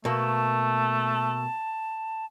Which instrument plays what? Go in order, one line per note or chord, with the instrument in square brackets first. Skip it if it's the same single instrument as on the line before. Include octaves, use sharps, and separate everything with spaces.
[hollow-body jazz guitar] B2 A#3 [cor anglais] A3 [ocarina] A5